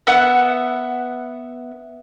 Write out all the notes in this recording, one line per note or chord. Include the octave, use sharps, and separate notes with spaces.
B3 E5 F#5